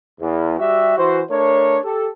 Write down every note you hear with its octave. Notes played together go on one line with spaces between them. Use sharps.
E2
G3 F#4 G4 E5
E3 F#4 C5
A3 D4 A#4 C#5
G4 A4